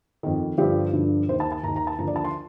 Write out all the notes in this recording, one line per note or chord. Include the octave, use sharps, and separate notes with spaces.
F2 D#3
G2 D3 F3 G4
G2 D3 F3
D#2 D#3 C5
A5
A5
D#2 D#3 A#5
A#5
A5
D#2 D3 F3 A#5
D5
A5
C6